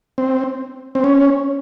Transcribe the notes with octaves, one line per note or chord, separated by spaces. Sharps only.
C4
C4
C#4